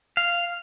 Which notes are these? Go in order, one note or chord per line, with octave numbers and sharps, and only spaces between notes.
F5